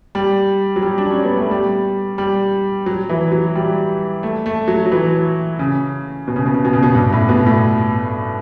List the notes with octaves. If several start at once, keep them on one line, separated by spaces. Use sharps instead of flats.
G3
F#3
G3
D4
C#4
B3
A3
G3
G3
F#3
E3
F#3
G3
A3
A3
F#3
F#3
E3
C#3
B2
C#3
B2
C#3
B2
C#3
B2
G2
A2
B2
A2